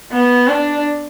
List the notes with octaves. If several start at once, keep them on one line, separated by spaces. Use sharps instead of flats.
B3
D4